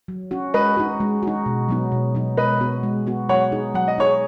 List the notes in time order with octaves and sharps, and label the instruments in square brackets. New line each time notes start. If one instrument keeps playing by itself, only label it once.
[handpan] F#3
C#4 F#4
[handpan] G#3 [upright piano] B4 D#5
[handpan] D#4 F#4
G#3
D#4 F#4
B2
F#3 B3 D#4
B2
F#3 B3 D#4
[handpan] G#3 [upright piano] B4 D#5
[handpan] B3 F#4
G#3
B3 F#4
[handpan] F#3 [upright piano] C#5 F#5
[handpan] D#4 G#4
[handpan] F#3 [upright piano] F#5
[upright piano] D#5
[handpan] D#4 G#4 [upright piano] C#5